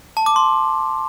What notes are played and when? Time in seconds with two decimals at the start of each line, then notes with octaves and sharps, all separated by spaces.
0.17 A5
0.26 D6
0.36 C6